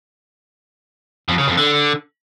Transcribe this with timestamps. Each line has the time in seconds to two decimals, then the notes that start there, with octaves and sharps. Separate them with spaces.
1.28 F2
1.38 C#3
1.48 F2
1.57 D3